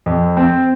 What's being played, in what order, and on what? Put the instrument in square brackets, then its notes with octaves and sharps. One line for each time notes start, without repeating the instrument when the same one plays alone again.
[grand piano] F2
C4